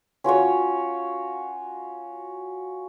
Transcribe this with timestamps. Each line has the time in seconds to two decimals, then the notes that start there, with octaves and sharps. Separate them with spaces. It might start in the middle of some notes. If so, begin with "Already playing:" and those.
0.24 C#4 F4 F#4 C#5